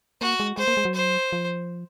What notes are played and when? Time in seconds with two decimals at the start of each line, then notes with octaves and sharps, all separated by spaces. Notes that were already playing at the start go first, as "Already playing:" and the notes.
0.21 A#3 F#4
0.40 G#3
0.58 G#3 C5
0.68 A#3
0.77 G#3
0.85 F#3
0.95 C5
1.32 F3